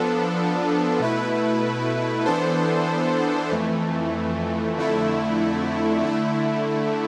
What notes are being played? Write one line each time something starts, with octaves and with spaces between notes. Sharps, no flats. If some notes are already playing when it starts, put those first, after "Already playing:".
Already playing: F3 B3 D4 A4
B2 A3 E4 B4
E3 B3 D4 A4 C5
F2 E3 A3
F2 D3 A3 E4
D3 A3 E4